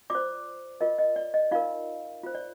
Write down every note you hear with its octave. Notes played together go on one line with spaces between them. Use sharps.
F4 C5 D5 D6
F4 A#4 D#5
D#5
D5
D#5
D#4 F4 A#4 F5
F4 C5
D5